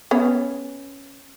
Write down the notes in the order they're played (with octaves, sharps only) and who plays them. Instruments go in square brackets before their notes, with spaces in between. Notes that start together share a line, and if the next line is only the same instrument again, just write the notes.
[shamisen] B3 C#4